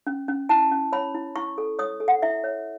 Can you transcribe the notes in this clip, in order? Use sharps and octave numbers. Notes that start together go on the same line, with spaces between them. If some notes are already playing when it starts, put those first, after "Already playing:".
C#4
C#4
E4 A5
C#4
C#5 B5
E4
E4 C#6
A4
C#5 D#6
A4
F#5
E4 E5
C#5